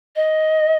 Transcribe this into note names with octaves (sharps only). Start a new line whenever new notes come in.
D#5